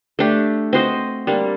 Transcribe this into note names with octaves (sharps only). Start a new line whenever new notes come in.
A3 D4 G4
C4 F#4 C5 D#5
G3 A#3 D4